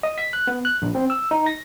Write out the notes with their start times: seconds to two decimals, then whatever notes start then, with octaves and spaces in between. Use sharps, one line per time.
0.03 D#5
0.18 B6
0.33 F#6
0.47 B3
0.65 F#6
0.82 A#1
0.95 C4
1.10 E6
1.31 D#4
1.46 A#6